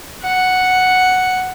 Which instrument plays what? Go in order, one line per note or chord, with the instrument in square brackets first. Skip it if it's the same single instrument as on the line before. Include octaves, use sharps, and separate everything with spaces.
[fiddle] F#5